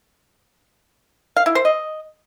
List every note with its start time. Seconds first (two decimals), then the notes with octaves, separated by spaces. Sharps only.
1.36 F5
1.46 E4
1.55 C5
1.65 D#5